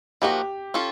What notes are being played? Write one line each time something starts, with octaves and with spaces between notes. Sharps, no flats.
F3 A#3 D#4 F#4 G4
C#4 F4 A4